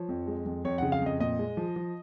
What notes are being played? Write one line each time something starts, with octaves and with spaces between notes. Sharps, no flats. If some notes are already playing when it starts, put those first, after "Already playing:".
Already playing: F3 C#5
F2
G#3
F2
F2 C#5
C#3 F#5
F5
F2 D#5
A#2 D#5
G#3
F3
F3